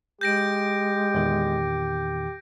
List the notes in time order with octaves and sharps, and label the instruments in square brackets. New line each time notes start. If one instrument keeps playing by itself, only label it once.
[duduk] G#3 [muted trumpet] G4 [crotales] G6 A#6 D7
[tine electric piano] E2 A#2 D#3